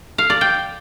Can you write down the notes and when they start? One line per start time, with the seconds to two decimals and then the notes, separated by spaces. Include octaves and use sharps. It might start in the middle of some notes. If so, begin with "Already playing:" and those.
0.18 F5
0.30 D5
0.41 G5